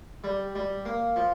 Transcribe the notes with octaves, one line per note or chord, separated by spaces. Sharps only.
G3
G3
A#3
F3